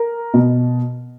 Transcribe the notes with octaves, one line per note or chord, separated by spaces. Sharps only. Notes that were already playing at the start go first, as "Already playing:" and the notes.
Already playing: A#4
B2